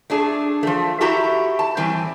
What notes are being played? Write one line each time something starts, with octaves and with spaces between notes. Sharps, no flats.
A3 D4 G#4
F3 A3
E4 F#4 G4 A4 E5 A#5
A5
A2 E3 G3 C4